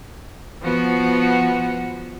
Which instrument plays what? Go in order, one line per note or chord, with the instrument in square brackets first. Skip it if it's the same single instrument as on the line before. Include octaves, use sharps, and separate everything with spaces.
[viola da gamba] F3 B3 F#4